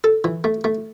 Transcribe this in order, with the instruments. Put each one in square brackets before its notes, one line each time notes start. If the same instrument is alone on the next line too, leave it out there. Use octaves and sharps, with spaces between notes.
[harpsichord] A4
E3
A3
A3